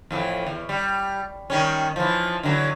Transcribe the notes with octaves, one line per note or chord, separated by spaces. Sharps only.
F2 A2 E3
E2
G3
D#3 G3 C#4
E3 F3
D3 E3 F#3